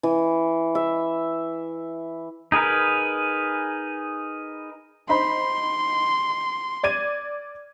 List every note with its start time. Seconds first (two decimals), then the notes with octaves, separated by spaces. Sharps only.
0.03 E3
0.75 E5
2.52 D#4 G#4 A#4 B4
5.09 D#4 C5 B5 C6
6.83 D5 G#6 D#7